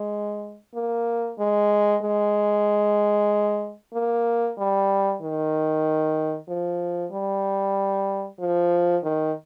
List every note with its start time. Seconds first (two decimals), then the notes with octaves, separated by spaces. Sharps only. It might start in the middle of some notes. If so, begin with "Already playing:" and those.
Already playing: G#3
0.75 A#3
1.39 G#3
2.02 G#3
3.94 A#3
4.58 G3
5.22 D#3
6.48 F3
7.12 G3
8.40 F3
9.04 D#3